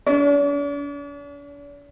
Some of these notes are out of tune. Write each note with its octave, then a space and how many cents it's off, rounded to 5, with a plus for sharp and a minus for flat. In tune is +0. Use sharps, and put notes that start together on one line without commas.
D4 -45